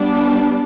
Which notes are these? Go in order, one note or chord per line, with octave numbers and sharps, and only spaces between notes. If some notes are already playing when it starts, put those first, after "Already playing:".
Already playing: G3 B3 D4